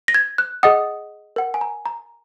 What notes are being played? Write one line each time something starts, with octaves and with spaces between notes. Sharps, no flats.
A#6
G#6
F#6
G#4 D#5 F#5 D#6
A#4 F#5
G#5
A#5
A#5